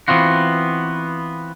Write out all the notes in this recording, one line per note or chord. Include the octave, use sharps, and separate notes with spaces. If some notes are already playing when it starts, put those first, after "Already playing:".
E3 F3 B3 C4 F4 F#4